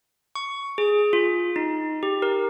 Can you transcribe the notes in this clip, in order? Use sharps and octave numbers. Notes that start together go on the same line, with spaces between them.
C#6
G#4
F4
D#4
G4
A#4